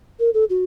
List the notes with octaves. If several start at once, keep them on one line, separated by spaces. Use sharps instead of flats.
A#4
A4
F#4